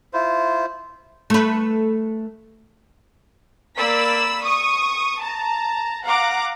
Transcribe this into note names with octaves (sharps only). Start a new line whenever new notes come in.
E4 F4 C5
A3 B4
A#3 D5 B5 E6 B6
C#6 D#6
A5 A#5
F5 F#5 A#5 D6